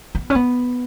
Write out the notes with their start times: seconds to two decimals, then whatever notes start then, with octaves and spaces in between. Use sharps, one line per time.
0.15 B3
0.30 C#4
0.35 B3